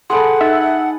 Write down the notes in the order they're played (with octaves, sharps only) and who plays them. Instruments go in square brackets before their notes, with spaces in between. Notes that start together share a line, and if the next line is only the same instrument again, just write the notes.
[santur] G#4 B4 A5 [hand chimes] A4 C6 [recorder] F#5
[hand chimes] D#4 [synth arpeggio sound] E5